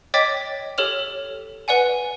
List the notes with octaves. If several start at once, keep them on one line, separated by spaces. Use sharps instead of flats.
C#5 D#5 G5 D6 A6 B6
G4 A4 C#5 F6 F7
B4 D5 F#5 G#5